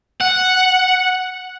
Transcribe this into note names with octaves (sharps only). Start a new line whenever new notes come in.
F#5